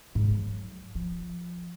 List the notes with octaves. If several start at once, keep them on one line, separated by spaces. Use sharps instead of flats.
G#2
F#3
F3